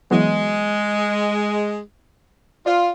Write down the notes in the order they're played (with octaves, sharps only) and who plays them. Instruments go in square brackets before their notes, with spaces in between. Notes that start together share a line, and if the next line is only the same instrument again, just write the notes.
[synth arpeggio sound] E3 F#3 B3 [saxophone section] G#3
[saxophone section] F4 [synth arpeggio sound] D5